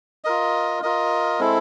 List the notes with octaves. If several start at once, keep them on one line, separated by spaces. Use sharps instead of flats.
F4 A#4 D#5
F4 A#4 D#5
G#3 C4 E4 A4